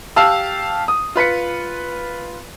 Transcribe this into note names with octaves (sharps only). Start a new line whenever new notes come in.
G4 F5 A5 E6
D#6
F4 B4 B6 C#7